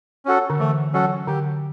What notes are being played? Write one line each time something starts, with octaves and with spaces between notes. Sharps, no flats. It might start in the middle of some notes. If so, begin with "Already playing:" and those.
C#4 F#4 A4
D3
E3 A3
F#3 C#4 F#4 A4
D3 G4